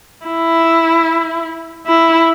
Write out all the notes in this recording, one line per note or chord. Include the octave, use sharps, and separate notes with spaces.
E4
E4